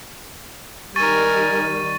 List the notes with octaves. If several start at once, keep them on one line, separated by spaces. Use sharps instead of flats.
D#3 G3 A#4 G#5 C#6 A6 D#7